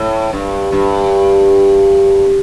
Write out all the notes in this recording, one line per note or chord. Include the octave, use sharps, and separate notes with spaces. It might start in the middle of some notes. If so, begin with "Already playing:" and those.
Already playing: A2
G2
G2